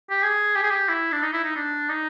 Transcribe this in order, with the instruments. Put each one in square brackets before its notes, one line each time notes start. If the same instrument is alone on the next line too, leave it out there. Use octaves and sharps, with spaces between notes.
[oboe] G4
G#4
G4
G#4
G4
E4
D4
D#4
E4
D#4
D4
D#4